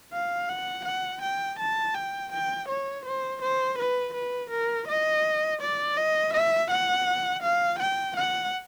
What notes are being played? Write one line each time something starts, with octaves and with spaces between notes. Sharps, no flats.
F5
F#5
F#5
G5
A5
G5
G5
C#5
C5
C5
B4
B4
A#4
D#5
D5
D#5
E5
F#5
F5
G5
F#5